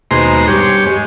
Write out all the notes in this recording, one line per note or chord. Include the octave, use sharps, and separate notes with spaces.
D#2 B2 G#3 C5 A#5 C6
G2 G4 C#5
G#3